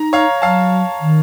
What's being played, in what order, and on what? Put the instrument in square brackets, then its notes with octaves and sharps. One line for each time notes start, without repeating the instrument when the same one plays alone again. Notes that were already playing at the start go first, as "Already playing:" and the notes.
Already playing: [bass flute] D#4 [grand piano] A#5
[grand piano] C#5 F5
[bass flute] F#3 [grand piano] F5 A5
[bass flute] D#3